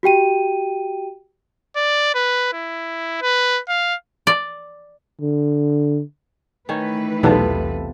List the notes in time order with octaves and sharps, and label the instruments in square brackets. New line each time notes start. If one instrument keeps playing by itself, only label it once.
[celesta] F#4 G4 G5 D#7
[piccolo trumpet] D5
B4
E4
B4
F5
[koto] D5
[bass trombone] D3
[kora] D#3 C#4 [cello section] E3 A3 B4
[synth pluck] B1 E2 [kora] C3 B3 F4 [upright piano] A4 A5